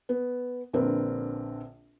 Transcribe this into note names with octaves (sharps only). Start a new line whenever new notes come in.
B3
A#1 D3 C4 A#4 B4